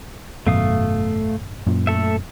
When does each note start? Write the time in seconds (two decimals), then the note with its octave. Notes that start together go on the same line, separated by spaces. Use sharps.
0.47 G#1 F#2 B2 A3 F5 D#6
1.67 F#2 A#2
1.87 A3 A4 E5